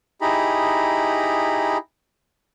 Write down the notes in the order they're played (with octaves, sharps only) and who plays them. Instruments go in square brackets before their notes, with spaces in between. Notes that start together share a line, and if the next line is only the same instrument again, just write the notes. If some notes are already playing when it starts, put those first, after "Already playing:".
[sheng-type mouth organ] D#4 E4 G4 G#4 A#5 B5